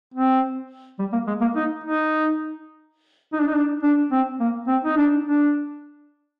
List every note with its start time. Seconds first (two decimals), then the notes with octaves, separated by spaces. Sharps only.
0.14 C4
0.99 G3
1.13 A#3
1.27 G#3
1.41 A#3
1.56 D#4
1.84 D#4
3.33 D#4
3.40 D4
3.47 D#4
3.55 D4
3.83 D4
4.12 C4
4.40 A#3
4.68 C4
4.84 D#4
4.97 D4
5.25 D4